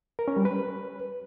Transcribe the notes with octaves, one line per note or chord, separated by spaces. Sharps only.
A#4
C#4
G3
B4